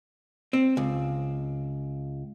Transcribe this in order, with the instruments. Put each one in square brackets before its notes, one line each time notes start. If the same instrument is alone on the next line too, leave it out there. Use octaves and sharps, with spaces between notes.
[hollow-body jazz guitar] C4
C#2